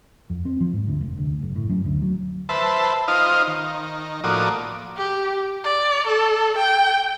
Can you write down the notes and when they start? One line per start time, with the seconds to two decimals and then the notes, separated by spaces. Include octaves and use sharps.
0.30 F2
0.45 C4
0.60 F3
0.74 G#2
0.87 D2
1.01 F1
1.18 D2
1.41 F#1
1.56 A2
1.69 F#2
1.85 D2
2.02 F#3
2.49 B4 C5 E5 A5
3.08 D#4 F4 C5 D#5 F5
3.47 D#3
4.24 A2 F3 A#3 F#4 D5 D#6
4.97 G4
5.64 D5
6.07 A4
6.58 G5